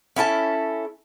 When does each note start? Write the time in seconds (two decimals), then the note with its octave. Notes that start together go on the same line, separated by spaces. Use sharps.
0.16 C#4 E4 A4 A5